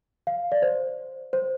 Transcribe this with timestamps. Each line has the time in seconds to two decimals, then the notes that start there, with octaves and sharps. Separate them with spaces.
0.27 F5
0.52 D5
0.62 C5
1.33 C5